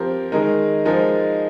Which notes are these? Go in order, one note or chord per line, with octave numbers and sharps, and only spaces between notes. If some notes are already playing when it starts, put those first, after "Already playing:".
Already playing: F3 C4 G4 A#4
D#3 G#3 D#4 A#4
F3 G#3 D#4 A#4